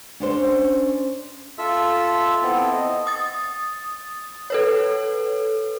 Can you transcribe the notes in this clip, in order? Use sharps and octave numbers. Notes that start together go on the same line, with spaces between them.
C#4 D4 C5
F4 A4 E5 E6
B3 C4 E4 A4
D#5
D#6 A6
A4 B4 C#5